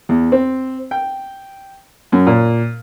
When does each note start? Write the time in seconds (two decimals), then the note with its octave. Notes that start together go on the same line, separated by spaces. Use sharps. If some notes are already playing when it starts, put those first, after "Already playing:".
0.09 E2
0.32 C4
0.91 G5
2.12 F#2
2.27 A#2